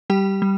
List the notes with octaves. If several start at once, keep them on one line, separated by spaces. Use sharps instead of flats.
G3 G4 G5
G3